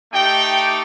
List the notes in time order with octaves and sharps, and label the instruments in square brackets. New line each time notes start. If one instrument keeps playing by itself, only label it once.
[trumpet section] A3 D#4 G4 G5